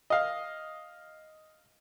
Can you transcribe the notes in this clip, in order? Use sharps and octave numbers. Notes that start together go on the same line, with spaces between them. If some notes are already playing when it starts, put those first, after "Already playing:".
D#5 F5